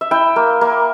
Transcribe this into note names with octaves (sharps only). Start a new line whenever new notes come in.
E5
E4 G5
A#3
A#3